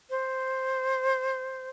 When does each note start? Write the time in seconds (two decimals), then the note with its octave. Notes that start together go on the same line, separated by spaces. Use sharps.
0.10 C5